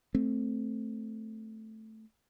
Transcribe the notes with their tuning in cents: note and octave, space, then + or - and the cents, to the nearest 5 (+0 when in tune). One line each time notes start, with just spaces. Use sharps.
A3 +0 C4 +0